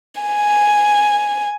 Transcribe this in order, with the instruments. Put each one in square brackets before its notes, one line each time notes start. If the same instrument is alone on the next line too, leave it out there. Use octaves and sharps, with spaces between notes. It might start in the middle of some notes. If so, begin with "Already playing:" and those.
[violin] G#5